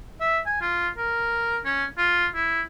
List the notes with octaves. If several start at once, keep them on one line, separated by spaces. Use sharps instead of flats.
E5
G#5
F4
A#4
C#4
F4
E4